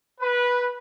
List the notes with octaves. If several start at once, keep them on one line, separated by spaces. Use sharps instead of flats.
B4